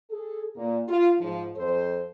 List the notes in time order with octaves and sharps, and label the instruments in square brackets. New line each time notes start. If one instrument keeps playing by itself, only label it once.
[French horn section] G#4 A4
A#2
F4
G#2 F3
F2 A4 C5